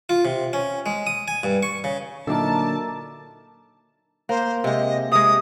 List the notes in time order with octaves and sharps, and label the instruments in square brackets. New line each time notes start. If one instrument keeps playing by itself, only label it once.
[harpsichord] F4
C3
C#4
G#3
D#6
G#5
G2
C#6
C#3
[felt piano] A#2 F#3 D#4 [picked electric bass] D3 [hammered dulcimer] A#4 D5 E5 [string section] A5
[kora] A#3 [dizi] C5
[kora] C3 G#3 [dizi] D#5
[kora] C3 G#3 [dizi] D#6